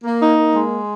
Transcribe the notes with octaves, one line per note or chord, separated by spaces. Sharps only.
A#3
D#4
A#3
G#3